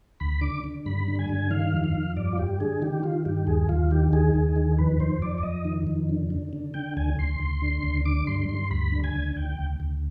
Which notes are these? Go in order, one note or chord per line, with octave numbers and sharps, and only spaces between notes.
D2 B5
D3 D6
D3
G2 B5
D3
G#5
G2
D#3 F5
F2
F5
F2
G2 D5
F4
G2 G4
D3 G#4
D#3 G4
D#3 F4
G2 G4
D#2 G#4
D#2 F4
D#3 G4
D#2 G#4
D#2
D#3
F2 B4
F2 C5
F2 D5
D5
F2 D#5
D#3
F2
D3
D3
D3
D3 G5
D2 G#5
D2 C6
D2
D3
D2
D3 D6
G2 C6
G2 C6
D2 B5
D3
G#5
D2
D2 G5
D2
D2